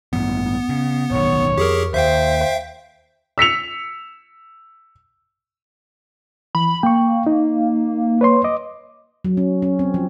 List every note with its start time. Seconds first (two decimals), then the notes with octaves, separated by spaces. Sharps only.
0.13 A1 G2 E3 B3
0.69 C#3
1.11 D1 B1 D#3 C#5
1.58 F2 G4 G#4 A#4
1.94 D#2 C5 E5 F5 G5
3.38 E6 B6 C#7 F7
6.55 E3 B5
6.83 A#3 G5 C#6
7.27 D#4
8.21 B4 C#5 C6
8.44 D#5 D6
9.25 F#3
9.37 C#4
9.62 C#4
9.79 C4
9.94 F3